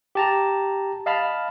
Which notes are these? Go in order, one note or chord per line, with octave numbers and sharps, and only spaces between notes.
G4 A5 A#5
D#5 F5 A5 B5 F6